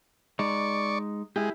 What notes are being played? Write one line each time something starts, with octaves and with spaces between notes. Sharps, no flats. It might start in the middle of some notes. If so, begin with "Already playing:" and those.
G#3 D#4 D5 C#6
G#3 E4 G4